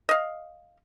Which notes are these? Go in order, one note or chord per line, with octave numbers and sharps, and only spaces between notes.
D#5 F5